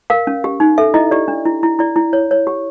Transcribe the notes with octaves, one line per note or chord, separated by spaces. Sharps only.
A#4 F5
C#4
G4
D#4
A4 E5
E4 D#5
G4 D5
D4
E4
E4
E4 D5
E4
C#5
C#5
G4